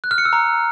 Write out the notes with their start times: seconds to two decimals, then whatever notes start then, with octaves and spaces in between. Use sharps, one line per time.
0.04 F#6
0.11 F6
0.18 C#7
0.25 E6
0.33 A#5